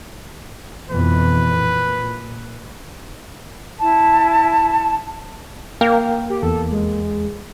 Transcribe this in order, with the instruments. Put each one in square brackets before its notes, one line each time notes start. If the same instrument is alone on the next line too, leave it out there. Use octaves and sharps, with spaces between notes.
[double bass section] F2 B2 E3 [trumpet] B4
[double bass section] A#2
[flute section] E4 A5
[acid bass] A#3 [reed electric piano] A#4 F5 G5
[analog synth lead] G4
[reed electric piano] E2 [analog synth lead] A4
[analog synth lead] G#3